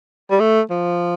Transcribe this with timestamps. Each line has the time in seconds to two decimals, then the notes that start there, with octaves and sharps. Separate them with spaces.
0.31 G3
0.40 A3
0.70 F3